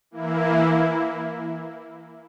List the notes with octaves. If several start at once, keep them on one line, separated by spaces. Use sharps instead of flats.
E3 A#3 E4